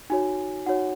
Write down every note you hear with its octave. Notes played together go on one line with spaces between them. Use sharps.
D#4 F#4 C#5 G#5
D#4 F#4 C#5 F#5